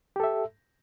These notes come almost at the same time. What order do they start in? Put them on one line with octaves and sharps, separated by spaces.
G4 A4 E5